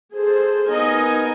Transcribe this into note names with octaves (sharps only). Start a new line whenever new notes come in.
G#4 A4 C5
B3 D#4 A#4 D#5 G#5